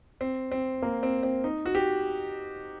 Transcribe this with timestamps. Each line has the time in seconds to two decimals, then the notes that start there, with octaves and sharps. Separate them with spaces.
0.21 C4
0.52 C4
0.82 A#3
1.03 C4
1.23 C4
1.44 D#4
1.66 F#4
1.75 G4